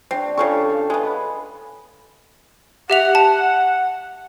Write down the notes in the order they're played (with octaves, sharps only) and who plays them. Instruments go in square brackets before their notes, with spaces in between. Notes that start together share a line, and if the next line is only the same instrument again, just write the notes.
[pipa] C4 [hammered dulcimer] D4 G4 C#5
[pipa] C#3 F3 C#6 [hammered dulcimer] A4
[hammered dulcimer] F5
[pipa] G#3 B3
[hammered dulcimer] B5
[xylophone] G4 E5 F7 [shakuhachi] F#5
[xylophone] A5